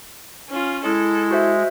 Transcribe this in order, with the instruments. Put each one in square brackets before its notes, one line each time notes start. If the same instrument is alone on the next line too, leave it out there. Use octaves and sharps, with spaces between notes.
[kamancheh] C#4 F4
[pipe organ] G#3 [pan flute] E4 [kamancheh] A4
[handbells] F#4 C5 E5